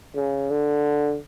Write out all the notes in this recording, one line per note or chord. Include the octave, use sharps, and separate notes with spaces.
C#3
D3